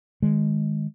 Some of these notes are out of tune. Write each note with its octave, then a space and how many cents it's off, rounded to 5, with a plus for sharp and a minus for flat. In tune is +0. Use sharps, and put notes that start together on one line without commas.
D#3 -10 G#3 +0